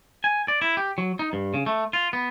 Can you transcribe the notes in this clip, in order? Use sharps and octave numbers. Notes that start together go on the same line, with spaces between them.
G#5
D5
E4
G4
F#3
D#4
G2
C#3
A3
F4
B3